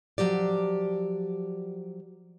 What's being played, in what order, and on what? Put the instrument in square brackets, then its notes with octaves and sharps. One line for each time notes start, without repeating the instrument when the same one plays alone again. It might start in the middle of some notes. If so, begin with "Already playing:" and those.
[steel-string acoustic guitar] F3 F#3 G4 D5